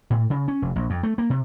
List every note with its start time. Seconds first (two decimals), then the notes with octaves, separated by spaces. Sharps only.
0.10 A2
0.30 C#3
0.48 C#4
0.62 F1
0.76 A#1
0.90 F2
1.03 A3
1.18 A#3
1.30 C3